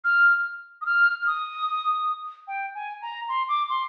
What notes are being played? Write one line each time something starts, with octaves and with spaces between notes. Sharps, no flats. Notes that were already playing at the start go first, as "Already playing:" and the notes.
F6
D#6
F6
D#6
G5
G#5
A#5
C6
D6
C6